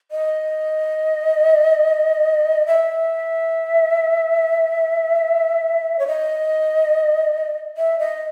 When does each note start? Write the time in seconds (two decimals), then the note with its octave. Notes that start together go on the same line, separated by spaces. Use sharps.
0.11 D#5
2.67 E5
5.99 C#5
6.07 D#5
7.77 E5
7.99 D#5